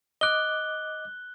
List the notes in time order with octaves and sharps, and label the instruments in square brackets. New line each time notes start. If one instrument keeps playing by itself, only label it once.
[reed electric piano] D#5 D6 [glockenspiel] F#6 G7